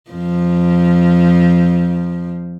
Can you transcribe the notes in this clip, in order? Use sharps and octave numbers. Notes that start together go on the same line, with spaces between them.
F2 F3